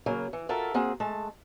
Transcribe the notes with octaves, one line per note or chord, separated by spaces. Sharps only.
C#3 F#3 A#3
E3
F4 F#4 A4 A#4 E5
A#3 C4 F#4 G#4
G#3 A3 A5